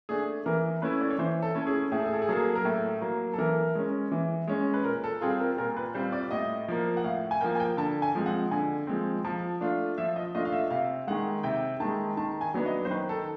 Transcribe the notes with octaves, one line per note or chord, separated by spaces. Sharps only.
A3 D4 G#4
E3 A#4
A3 C#4 E4 B4
D5
C#5
E3 C5
A4
A3 C#4 E4
G#4
A2 G#4
A4
G#4
A4
G#4
F#3 A#3 A4
G#4
A#4
A2 A4
F#3 A#3
A4
E3 A#4
G#3 C#4
E3
G#3 C#4
B4
A#2 A#4
A4
G3 C4 F4 G#4
A#4
A#2 A#4
B4
G3 C4 F4 C5
D5
A2 D#5
F3 A#3
F#5
A2 F5
G#5
F3 A#3 G5
G#5
G5
D3 A5
G#5
F3 G#3 C4
F#5
D3 G#5
F3 G#3 C4
F3 A5
A3 D4 F4
F3 E5
D#5
A3 D4 F4 D#5
F5
E5
C3 F5
D#3 G#3 F#5
C3 G5
D#3 G#3 A5
D#3 A5
G#5
F#3 B3 D4
D#5
C5
D#3 B4
A4